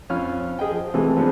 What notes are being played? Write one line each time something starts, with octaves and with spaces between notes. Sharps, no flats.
F2 C#4 F4 B5 F6
G4 G#4 D#5 G5
F3
C3 E3 F3 G#3 A3
F3 G#3 B3 C4 D4